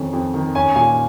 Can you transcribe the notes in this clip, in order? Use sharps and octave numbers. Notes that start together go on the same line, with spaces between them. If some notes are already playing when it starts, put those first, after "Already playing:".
Already playing: F2 D#3 C#4
F2
D#3
C#4 G#5
A#2 G#5